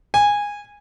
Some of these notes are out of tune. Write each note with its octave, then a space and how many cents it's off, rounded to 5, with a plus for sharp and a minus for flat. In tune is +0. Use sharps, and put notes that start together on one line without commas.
G#5 -15